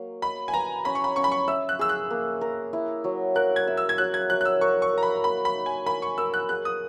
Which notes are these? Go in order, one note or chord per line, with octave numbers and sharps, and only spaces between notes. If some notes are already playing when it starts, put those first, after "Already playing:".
Already playing: F#3 A#3
D#5 B5
G#5
B4 A#5
C#4 B5
C#6
B5
C#4 C#6
B5
C#6
E5 E6
F#6
G#4 E6
F#6
A#3
A#4
E4
F#3
A#4 F#6
G#6
E5
E6
G#6
F#3 F#6
G#6
F#3 F#6
F#6
E6
A#4 C#6
C#6
A#4 A#5
B5
A#3 B5
B5
D#4
G#5
A#4 B5
C#6
A#4 E6
F#6
G#4 F#6
D#6